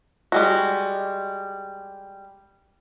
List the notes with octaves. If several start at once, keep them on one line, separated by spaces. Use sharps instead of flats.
G3 G#3 F#4